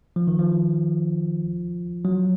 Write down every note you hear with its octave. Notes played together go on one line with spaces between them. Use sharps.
F3
D#3
F3
F#3